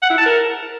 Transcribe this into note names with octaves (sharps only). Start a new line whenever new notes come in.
F#5
E4
A5
A#4